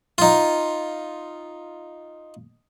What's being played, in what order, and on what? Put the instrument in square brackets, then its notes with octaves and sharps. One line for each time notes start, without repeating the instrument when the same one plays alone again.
[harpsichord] D#4 F4